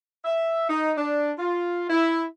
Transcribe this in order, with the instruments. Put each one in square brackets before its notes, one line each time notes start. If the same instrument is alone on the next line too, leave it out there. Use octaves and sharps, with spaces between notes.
[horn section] E5
D#4
D4
F4
E4